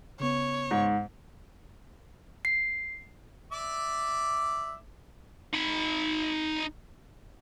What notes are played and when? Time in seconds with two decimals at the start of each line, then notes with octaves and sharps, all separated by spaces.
0.20 C#3 B3 C#5
0.71 G#2
2.45 C7
3.52 D5 E5 D6
5.54 D#4 B5